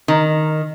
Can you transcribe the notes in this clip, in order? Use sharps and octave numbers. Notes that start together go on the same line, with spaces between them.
D#3